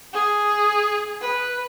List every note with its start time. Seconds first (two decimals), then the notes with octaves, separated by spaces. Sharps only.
0.13 G#4
1.21 B4